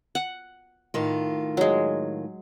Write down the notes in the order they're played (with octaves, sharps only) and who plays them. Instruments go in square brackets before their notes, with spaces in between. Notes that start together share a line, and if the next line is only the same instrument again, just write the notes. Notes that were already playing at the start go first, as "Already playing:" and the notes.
[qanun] F#5
[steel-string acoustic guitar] A2 D#3 F4
[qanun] F#3 G#3